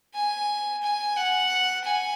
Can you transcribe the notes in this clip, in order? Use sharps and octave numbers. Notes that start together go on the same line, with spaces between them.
G#5
G#5
F#5
G#5